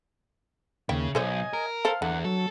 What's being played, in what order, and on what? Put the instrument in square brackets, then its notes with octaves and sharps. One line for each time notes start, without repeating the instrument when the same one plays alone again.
[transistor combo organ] D#2 [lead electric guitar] C#3 [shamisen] E5 G5
[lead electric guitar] B1 [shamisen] A4 C5 C#5 [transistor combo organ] D#5 G#5
[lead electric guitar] A#4
[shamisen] A4 C5 [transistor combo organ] F5
[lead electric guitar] E2 [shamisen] D3 [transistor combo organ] F#5
[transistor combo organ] F#3 [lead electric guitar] A4